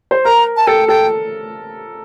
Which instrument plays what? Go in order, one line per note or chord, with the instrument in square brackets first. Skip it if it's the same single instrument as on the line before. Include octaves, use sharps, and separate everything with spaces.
[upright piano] C5
[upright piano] A#4 [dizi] A#5
[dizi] A5
[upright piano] A4 [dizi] G5
[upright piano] A4 [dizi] G5